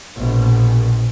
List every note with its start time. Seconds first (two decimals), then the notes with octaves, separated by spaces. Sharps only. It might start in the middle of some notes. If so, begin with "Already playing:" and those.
0.16 A#1 B2